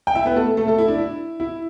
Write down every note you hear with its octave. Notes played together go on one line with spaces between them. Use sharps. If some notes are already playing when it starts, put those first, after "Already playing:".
G5
E4 E5
B3 B4
A3 A4
A3 A4
A3 A4
E4
D4
E4
E4